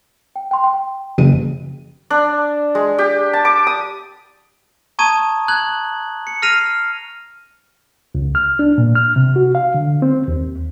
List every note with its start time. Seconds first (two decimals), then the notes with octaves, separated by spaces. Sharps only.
0.36 G5
0.51 G5 C6
0.64 G5
1.18 F#1 D#7
2.10 D4
2.75 G#3
2.98 G4
3.33 A5
3.45 D6
3.67 D#6
4.99 A5 A#5 C#6 D#6 G#6 D#7
5.48 A#5 F#6 G#6 F#7
6.27 C#7
6.42 F6 A#6 C7 D#7 F7
8.15 C#2
8.35 F6
8.59 D4
8.78 A#2
8.95 F6
9.16 C3
9.36 F#4
9.55 F5
9.74 D3
10.02 C4
10.28 D#2